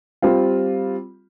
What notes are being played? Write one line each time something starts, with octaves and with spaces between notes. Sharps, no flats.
G3 C4 F4